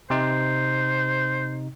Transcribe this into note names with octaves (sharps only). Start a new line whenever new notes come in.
C3 D#4 C5